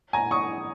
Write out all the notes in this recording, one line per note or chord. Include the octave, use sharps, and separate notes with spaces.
G#5 A#5
C#6 D#6